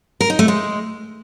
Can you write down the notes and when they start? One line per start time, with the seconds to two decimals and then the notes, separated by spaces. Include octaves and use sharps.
0.21 A#4
0.30 D#4
0.39 A3
0.48 G#3